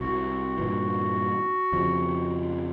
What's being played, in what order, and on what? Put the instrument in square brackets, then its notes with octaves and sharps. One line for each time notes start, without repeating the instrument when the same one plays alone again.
[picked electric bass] C2 [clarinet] F#4
[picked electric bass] G2 A#2 E3
F2 C#3 F3